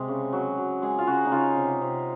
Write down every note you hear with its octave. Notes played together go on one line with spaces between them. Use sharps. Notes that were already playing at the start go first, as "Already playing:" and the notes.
Already playing: C3 G#3
C#3
F#3
F#3
G#3 G#4
F4
C#3 F#4
D#4
C#3 F4
C3
C3